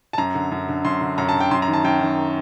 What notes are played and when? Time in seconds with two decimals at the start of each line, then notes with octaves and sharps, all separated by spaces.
0.13 A5
0.18 F#2 A#5
0.35 D3
0.52 F#2
0.69 D3
0.85 F#2 C6
1.01 D3
1.18 F#2 A#5
1.29 A5
1.34 D3
1.40 G5
1.51 F#2 C6
1.62 A#5
1.68 D#3
1.73 A5
1.84 F#2 G5
2.01 D#3